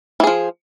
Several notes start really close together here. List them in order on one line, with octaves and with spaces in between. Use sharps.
E3 G#4 F3